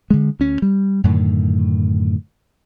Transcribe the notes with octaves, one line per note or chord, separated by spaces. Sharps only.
D3 G#3
D2 C#4
G3
F#2 A2 D3 D#3